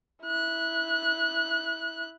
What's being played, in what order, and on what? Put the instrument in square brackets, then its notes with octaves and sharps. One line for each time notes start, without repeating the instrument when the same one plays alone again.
[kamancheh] E4 F#6